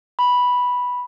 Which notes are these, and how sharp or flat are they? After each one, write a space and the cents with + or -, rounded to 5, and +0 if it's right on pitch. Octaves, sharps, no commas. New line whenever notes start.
B5 -5